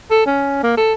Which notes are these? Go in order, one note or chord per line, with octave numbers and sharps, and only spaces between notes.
A4
C#4
A#3
A4